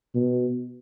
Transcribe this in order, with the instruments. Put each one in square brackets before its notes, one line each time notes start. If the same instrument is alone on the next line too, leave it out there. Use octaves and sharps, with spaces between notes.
[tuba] B2